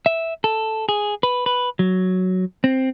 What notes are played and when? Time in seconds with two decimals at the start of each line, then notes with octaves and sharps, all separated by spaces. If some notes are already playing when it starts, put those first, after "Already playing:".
0.06 E5
0.44 A4
0.89 G#4
1.23 B4
1.46 B4
1.79 F#3
2.64 C4